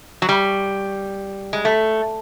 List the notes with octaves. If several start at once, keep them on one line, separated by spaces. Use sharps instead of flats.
F#3
G3
G#3
A3